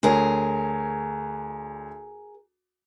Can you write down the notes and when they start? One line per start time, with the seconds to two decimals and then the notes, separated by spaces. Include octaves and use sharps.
0.03 D2 G#4 A#4 C#5